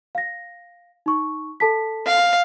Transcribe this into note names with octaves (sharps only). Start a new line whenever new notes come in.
F5 A#6
D#4 C#6
A4 A5 B6
F5